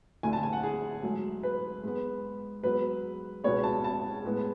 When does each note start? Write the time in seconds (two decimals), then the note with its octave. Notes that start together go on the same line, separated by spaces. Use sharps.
0.23 D2 D3 A3 G#5
0.33 A5
0.43 G#5
0.53 F#5
0.63 G#4
1.03 G#2 F#3 A3
1.43 B4
1.83 G#2 G#3 B3
2.63 G#2 F#3 B3 B4
3.44 C#2 B2 G#3 B3 C#5
3.64 A5
3.84 A5
4.25 A2 G#3 B3